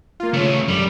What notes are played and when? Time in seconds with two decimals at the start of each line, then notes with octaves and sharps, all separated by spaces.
0.20 A#3 F4
0.33 C#3 A3 C#4
0.68 F#2 G3